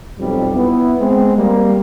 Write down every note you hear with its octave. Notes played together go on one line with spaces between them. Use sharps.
B1 F2 G3
B3 E4
G#3 C4
G3 A#3